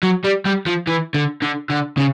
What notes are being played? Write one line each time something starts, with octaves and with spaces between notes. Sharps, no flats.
F#3
G3
G3
F3
E3
D3
D3
D3
C#3